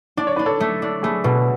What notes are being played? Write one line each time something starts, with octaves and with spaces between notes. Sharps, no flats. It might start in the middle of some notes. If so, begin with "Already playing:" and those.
D4 D5
C#5
D4 B4
A4 C#5
A3
D4
A3 G#4 B4
B2 F#4 A4
G#4